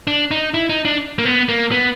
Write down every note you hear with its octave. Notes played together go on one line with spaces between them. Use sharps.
D4
D#4
E4
D#4
D4
A#3
B3
A#3
B3